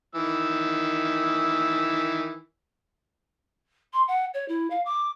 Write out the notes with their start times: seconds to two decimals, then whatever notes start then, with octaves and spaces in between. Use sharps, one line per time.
0.15 D#3 E3 E6
3.93 C6
4.08 F#5
4.34 C#5
4.48 E4
4.70 F5
4.85 D6